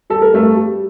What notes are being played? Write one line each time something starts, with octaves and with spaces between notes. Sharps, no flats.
G3 A4
A#4
G2 A3 A4
G3